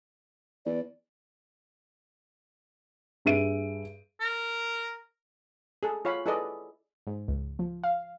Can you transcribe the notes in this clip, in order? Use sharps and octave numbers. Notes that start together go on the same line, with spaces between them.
E2 D5
G2 G#4 E5 D7 D#7
A#4
G#4 A4
F4 C#5 F5 B5
E4 G#4 A4 B4 D5 D#5
G#2
C#2
F3
F5